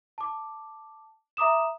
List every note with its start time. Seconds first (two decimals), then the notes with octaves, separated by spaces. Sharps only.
0.18 A5 D6
1.37 E5 A#5 D6 D#6 E7